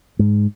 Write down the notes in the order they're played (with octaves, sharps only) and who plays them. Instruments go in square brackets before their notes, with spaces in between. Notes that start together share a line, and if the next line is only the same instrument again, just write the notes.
[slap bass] G#2